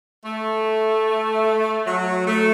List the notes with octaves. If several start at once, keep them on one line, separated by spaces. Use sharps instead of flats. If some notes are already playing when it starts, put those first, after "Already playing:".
A3
F#3
A3